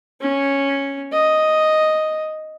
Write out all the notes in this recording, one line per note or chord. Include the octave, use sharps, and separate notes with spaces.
C#4
D#5